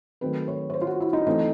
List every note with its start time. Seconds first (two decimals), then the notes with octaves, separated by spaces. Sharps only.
0.21 D#3 F#3 A3 C4 B4
0.48 C#5
0.70 C#5
0.74 C5
0.81 F4
0.87 F#4
1.00 E4
1.13 D#4
1.27 E3 A3 C4 D#4